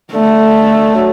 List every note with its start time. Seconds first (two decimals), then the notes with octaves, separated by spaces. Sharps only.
0.13 D3 A3
0.95 F#3